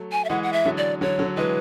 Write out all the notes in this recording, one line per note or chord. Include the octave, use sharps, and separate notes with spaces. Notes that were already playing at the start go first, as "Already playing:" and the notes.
Already playing: F#3 A3
G#5
E5
E3 G#3 F#5
F#5
E5
D3 F#3
D5
D3 F#3 C#5
D3 F#3
E3 G#3 B4